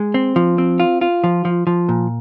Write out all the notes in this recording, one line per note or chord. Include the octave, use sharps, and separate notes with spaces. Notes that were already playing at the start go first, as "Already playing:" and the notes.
Already playing: G#3
C4
F3
C4
F4
F4
F3
F3
F3
A#2